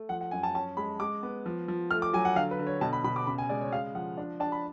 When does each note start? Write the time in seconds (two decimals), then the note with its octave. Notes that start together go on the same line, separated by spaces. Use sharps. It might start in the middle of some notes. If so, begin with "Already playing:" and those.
Already playing: A3
0.09 F3 F#5
0.21 F#5
0.31 F#2 G#5
0.43 A5
0.54 C#4 A5
0.77 G#3 B5
1.00 G#3 D6
1.23 B3
1.46 F3
1.68 F3
1.91 A3 F6
2.02 D6
2.13 F#3 G#5
2.25 F#5
2.36 D3 F5
2.51 B4
2.59 D3
2.67 C#5
2.81 B2 A5
2.93 B5
3.04 B2 B5
3.16 D6
3.27 C#3 B5
3.38 G#5
3.49 G#3 D5
3.61 C#5
3.73 G#3 F5
3.95 F3 F#5
4.18 D4
4.40 D4 A5
4.52 B5